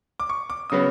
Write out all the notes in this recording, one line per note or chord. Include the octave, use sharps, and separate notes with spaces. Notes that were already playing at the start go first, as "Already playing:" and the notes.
D6
C#6
D6
C#3 F#3 B3 D#6